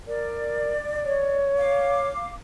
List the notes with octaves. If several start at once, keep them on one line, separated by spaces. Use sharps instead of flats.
A#4 D5
C#5
F5 D6